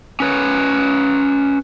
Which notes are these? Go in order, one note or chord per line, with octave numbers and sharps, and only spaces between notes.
C#4 B4 C#5